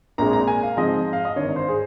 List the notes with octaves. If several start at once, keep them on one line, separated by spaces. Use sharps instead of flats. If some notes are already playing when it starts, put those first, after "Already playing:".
A#1 A#2 G#3 C4 A#5
A#5
G#5
F5
G#2 F3 G#3 C4 D#5
F5
D#5
G#1 G2 D#3 C#5
C5
G#4